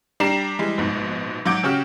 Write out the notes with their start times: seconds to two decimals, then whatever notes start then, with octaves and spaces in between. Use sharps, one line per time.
0.20 G3 D4 G4 A#5 C7 E7
0.59 E3 G3 G#3
0.78 A#1 G#2 B2
1.45 G#2 F#3 F#5 D6 G6 D7
1.63 C#3 C#4 F#4 G4 F6